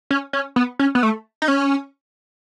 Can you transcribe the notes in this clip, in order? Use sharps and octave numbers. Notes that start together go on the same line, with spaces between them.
C#4
C#4
B3
C#4
B3
A3
D#4
C#4